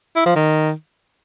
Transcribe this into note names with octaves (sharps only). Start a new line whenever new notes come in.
E4
F3
D#3